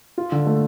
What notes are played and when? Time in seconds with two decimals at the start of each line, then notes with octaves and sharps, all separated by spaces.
0.18 F4
0.32 D3
0.47 A3